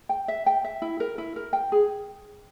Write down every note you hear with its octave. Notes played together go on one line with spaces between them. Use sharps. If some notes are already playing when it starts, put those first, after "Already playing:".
G5
E5
G5
E5
E4
A#4
E4
A#4
G5
G#4